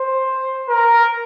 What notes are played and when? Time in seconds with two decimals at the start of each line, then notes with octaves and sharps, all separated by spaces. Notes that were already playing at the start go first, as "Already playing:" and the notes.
Already playing: C5
0.69 A#4